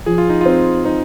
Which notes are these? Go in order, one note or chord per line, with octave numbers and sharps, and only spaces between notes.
F3 G#4
F4
D#4
C4 F4
C4 D#4